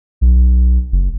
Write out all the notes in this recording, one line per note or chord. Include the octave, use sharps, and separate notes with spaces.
B1
F#1